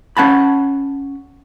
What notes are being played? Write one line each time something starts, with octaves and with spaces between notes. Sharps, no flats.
C#4 F#5 A5 B5